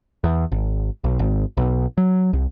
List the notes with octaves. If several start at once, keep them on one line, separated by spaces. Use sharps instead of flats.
E2
G#1
B1
G#1
B1
F#3
C2